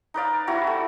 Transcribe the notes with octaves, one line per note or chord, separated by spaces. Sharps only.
D#4 B4 D5 F5
G3 C4 E4 F#4
A3